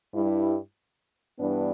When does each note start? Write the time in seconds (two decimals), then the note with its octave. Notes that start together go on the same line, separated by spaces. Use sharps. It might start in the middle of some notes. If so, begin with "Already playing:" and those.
0.14 G2 G3 E4
1.38 G2 E3 B3 D4